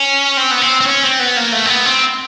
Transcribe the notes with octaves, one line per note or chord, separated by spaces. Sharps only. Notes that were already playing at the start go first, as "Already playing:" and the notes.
Already playing: C#4
C4
B3
C4
C4
C#4
C4
B3
A#3
A3
C4
B3
C4